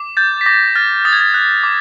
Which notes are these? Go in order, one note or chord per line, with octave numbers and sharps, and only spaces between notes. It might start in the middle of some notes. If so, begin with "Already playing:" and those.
Already playing: D6
G6 A6
B6
D6 A#6
F6 A6
D#6 A6
G#6
A6
F#6
D6